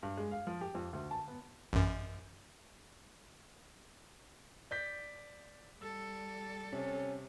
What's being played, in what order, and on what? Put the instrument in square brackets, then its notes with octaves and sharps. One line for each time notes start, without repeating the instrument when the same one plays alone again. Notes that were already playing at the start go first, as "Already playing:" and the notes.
[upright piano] G2
G#3
F5
F3
G4
F2
D2
A5
B3
[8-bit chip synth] A1 F#2
[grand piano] D5 G6 B6
[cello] G3 A4 [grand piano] E6
[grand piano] C3 [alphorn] C#4